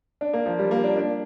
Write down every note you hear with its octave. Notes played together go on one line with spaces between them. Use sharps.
D4
A#3
F3
G3
A#3
D4
D4